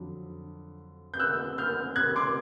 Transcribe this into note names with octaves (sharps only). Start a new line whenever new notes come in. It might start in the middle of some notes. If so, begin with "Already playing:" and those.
Already playing: F2 D3 F#3
G6
E6 F#6
F6 G6
F#6 G#6
C6 D6